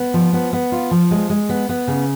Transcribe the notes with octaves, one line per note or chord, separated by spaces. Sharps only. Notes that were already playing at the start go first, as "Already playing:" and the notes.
Already playing: B3
F3
B3
B3
F4
F3
G#3
G#3
B3
B3
C#3